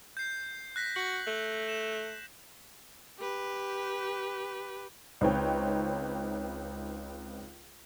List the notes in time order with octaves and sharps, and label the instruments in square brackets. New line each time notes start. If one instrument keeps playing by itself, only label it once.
[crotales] G6 C7
F#6 A#6 B6
[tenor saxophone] F#4 [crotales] F#7
[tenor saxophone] A3 [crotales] G6
[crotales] E7
[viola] G4 B4
[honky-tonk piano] C#2 C4 D#4 B4 C#5 G5